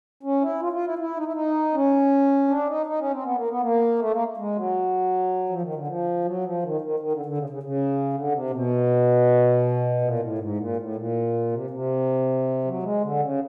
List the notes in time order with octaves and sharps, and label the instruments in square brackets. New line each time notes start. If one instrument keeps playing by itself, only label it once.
[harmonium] C#4
E4
F4
F4
E4
E4
D#4
E4
D#4
C#4
D4
D#4
D#4
C#4
C4
B3
A#3
B3
A#3
A3
A#3
G#3
F#3
F3
D#3
D3
F3
F#3
F3
D#3
D#3
D#3
D3
D3
C#3
C#3
C#3
D3
C3
B2
A#2
A2
G#2
A#2
A2
A#2
C3
C3
F#3
G#3
D3
C#3